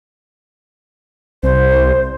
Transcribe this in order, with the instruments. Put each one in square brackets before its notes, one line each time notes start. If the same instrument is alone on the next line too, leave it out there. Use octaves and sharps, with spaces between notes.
[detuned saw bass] C2 [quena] C5